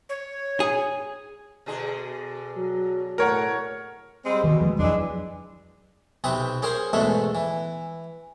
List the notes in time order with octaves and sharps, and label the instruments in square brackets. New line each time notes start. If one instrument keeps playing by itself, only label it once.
[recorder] C#5
[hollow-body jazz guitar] G#4
[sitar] B2 D3 G#4
[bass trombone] F#3
[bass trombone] A2 [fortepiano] A#4 C#5 F#5
[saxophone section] G3 G#3 C4
[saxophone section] B2 [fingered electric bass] D#3
[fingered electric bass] F3 G#3 A3
[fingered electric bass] F2 F#3 [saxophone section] E3 G#3 D4
[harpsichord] B1 C3 C4 B4 D#6
C#4 G#4 A#4 C5
E2 G#2 B2 G#3 A3 E5
E3